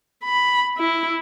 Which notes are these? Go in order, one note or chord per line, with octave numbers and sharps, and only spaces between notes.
B5
E4